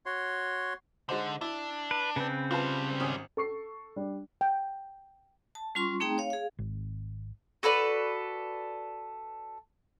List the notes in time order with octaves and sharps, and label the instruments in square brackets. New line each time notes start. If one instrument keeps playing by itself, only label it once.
[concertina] F#4 C#5 C6
[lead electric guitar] D3 [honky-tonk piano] G#3 D#4 C5
[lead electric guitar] D4 [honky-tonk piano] E4
[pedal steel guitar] B4
[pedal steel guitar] C#3 C4 [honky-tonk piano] B4
[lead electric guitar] G3 C5 [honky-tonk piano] F4 B4 A5
[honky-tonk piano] G#1 C#4 D#6
[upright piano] A4 C#6 C7
G3 D4
[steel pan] G5
[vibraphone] A5
G3 C#4 F4 C6 C#6
A3 C4 D#4 G#4 G5 A#5
C#5 F5
G#4 F5
[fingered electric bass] G#1
[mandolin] F#4 A4 B4 D5